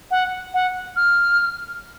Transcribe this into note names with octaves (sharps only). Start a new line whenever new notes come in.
F#5
F#5
F6